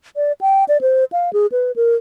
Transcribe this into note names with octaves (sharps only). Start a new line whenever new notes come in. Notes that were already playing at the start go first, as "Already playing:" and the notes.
D5
G5
D5
C5
F5
G#4
B4
A#4